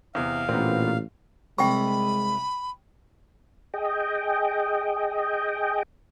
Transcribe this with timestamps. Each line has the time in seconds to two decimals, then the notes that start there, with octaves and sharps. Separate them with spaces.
0.15 E2 C3 F5
0.49 A1 A#2 B3 C4
1.58 C2 C3 G#3 G5 A#5 B5 C#6
3.74 G#4 D#5 G5